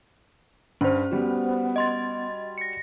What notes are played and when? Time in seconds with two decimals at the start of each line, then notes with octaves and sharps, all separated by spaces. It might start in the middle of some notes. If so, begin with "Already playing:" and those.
0.81 G2 C#4 C5
1.11 G3 B3 F#4
1.76 D#5 C6 A6
2.58 A#6 C#7